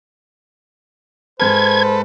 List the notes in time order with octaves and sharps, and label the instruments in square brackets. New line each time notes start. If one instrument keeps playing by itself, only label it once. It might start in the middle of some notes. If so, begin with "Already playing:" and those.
[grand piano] G#2 G#5 F6 [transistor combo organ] A4 B4 [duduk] C5 [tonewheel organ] G#6